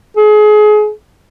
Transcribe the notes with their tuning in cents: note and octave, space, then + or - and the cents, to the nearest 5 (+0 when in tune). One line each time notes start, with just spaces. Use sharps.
G#4 +30